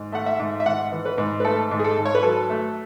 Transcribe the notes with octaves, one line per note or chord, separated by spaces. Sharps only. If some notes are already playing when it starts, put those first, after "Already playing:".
Already playing: G#2
A3 F#5
E5
G#2
E5
G#2 F#5
E3
B4
G#2
B4
A3 A4
G#2
G#4
A4
G#2
C#5
B4
F#3 A4
A3